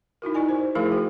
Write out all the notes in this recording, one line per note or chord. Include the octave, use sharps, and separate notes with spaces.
D#4 E4 F#4 A#4
E4 A#4 D5 D#5 G#5
C5
F3 A3 E4 G#4 A#4 F5
F#4 G5